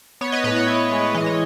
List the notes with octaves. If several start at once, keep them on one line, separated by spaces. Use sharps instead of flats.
B3 C#5
B4 D#5
A2 B4 D#5
C#5
E4
G#3
E3 D#5
C#5